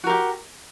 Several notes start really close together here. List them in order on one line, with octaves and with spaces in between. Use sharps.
F#4 A#4 G4